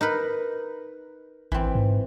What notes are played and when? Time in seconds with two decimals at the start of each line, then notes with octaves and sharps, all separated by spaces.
0.01 D#4 A#4 B4
1.52 A1 E3 C4
1.75 G#2